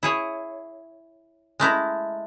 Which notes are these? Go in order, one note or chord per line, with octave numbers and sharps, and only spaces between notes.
E4 G#4 C#5
G#3 A3 E4 A#5